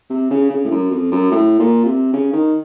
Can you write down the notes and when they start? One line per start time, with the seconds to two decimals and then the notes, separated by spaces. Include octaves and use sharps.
0.10 C3
0.31 C#3
0.50 C#3
0.65 A2
0.71 F#2
0.91 F2
1.12 F#2
1.31 A2
1.59 A#2
1.85 C3
2.13 C#3
2.33 D#3